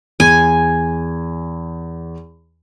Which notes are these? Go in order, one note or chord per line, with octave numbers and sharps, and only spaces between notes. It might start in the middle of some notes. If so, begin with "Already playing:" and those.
E2 G#5